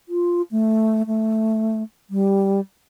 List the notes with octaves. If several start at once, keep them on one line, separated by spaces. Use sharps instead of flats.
F4
A3
A3
G3